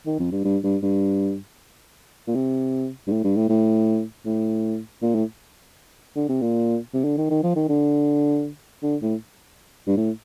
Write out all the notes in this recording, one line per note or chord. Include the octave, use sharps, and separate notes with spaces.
D#3
F2
G2
G2
G2
G2
A#2
C3
G2
A2
G2
A2
A2
A2
A#2
A2
D3
C3
A#2
C3
D3
D#3
D#3
F3
D#3
D3
D3
A2
G2
A2